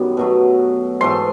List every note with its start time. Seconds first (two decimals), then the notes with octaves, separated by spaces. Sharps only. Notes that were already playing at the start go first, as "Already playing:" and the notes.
Already playing: F#2 D#3 G3 B3
0.17 B2 F#3 A3
1.01 G#2 E3 A3 C6